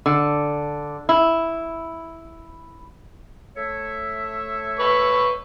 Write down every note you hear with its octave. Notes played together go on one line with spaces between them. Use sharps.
D3
E4
A3 C#5 E5
B4 C#6